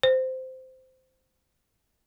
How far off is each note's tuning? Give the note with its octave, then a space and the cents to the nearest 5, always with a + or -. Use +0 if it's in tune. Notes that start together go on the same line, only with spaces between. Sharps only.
C5 -10